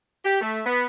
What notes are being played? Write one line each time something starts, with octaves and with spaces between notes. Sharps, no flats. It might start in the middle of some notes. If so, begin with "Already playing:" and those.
G4
A3
B3